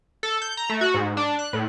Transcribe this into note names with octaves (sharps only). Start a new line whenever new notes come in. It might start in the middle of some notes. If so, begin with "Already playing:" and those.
A4
G6
A#5
A3
F#4
G#2
D4
F#6
A2